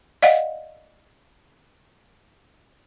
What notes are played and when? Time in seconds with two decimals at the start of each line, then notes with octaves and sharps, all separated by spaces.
0.22 D5 D#5 F5 F#5